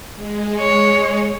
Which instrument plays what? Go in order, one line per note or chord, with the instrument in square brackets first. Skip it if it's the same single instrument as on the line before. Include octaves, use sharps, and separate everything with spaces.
[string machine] G#3
[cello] C#5